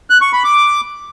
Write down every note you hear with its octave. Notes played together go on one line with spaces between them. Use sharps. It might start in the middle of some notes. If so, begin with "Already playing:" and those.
F#6
C#6
B5
D6